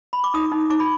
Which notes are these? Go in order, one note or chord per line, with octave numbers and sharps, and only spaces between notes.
B5
D6
D#4 D#6
D#4
D#4 D6
B5